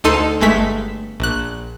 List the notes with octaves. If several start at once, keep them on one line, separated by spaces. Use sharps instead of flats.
D2 D#4 A4 C6 D#7
G1 G#3 A3 B6
A#1 F#6